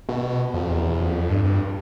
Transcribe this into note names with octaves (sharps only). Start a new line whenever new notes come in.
B2
F2
E2
F2
G2
G2